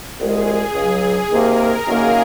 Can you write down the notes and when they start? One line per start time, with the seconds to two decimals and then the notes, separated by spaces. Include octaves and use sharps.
0.20 C2 A#2 G#3 G#4
0.75 C#2 C#3 F#3
1.30 C3 D#3 A#3 A#4
1.86 F#2 D#3 A#3 G#4